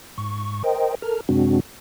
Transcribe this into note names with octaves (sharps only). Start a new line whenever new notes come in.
G#2 C#6
A#4 C5 D#5 G5
A4 A#4 F6
F#2 C3 G#3 C4 D4 F#4